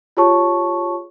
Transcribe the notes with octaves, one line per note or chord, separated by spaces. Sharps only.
F4 G4 G#4 C#5 A5 C#6